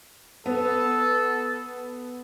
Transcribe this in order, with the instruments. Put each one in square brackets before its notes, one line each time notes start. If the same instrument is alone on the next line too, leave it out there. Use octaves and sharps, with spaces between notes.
[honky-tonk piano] B3 [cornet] A4